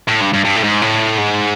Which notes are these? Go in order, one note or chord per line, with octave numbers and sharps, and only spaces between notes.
A2
G2
G2
G2
A2
G#2
A2
G#2